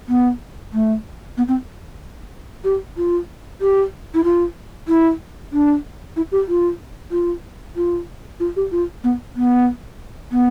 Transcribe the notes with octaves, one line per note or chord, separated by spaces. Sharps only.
B3
A3
B3
C4
G4
F4
G4
E4
F4
E4
D4
E4
G4
F4
F4
F4
F4
G4
F4
B3
B3
B3